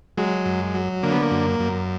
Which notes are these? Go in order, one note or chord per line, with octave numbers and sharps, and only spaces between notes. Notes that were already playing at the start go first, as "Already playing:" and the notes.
F#3 G#3
F#2
F#3
D3 A#3
B3
A#3
F#2
F#2